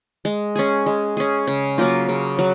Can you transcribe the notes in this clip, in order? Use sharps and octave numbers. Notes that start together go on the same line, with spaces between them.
G#3
C#4 G#4
G#3
C#4 G#4
C#3
F#3 A#3 F4
C#3
F#3